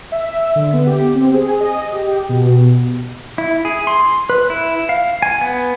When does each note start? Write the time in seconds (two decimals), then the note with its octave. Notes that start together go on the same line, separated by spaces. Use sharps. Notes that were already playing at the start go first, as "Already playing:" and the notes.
0.12 E5
0.56 D3
0.73 B3
0.87 G4
1.15 C4
1.34 G#4
1.60 D#5
1.93 G4
2.29 B2
3.38 E4
3.65 G#4
3.87 C6
4.30 B4
4.50 E4
4.89 F5
5.22 G#5
5.41 B3